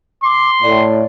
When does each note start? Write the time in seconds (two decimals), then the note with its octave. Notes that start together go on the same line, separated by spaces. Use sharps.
0.24 C6 D6
0.62 A2 D5